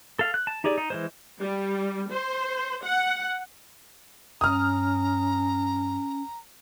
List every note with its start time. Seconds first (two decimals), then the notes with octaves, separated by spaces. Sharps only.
0.19 A4 F5
0.34 F#6
0.47 A5
0.64 D#4 G4 G#4 D5
0.78 D#4
0.90 E3 G#3 C5
1.40 G3
2.12 C5
2.84 F#5
4.41 G2 C#4 A#5 D#6 F6